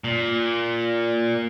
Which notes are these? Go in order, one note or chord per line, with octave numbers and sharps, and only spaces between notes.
A#2